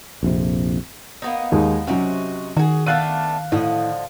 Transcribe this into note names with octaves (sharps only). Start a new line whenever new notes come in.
A#1 F2 C3
A#3 B3 D#4
D#2 G#3
C3 F#3 C#4 D#4 F#4
D#3 F#4 G#4
A3 B3 D4 F5 F#6 D#7
A2 D3 F3 D#5